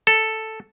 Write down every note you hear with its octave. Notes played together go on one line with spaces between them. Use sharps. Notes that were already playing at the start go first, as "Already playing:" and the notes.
A4